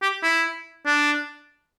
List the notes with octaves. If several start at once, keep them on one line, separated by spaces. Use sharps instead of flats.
G4
E4
D4